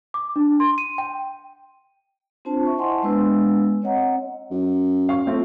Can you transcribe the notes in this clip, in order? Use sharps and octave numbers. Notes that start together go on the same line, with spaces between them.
D6
D4
C6
D#7
G5
C4 D4 F4 C5 A5
C5 E5 C#6
E4 D#5 F#5 G#5 A5 C6
G#3 B3 D4 B4 G#5 E6
C4 C#5 D#5 F#5 A#5
F#2
F5 C#6
A3 C4 F4